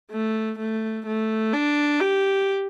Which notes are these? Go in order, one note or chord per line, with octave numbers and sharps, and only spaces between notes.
A3
A3
A3
D4
G4